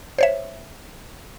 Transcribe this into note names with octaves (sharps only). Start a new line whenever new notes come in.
C5 C#5 E5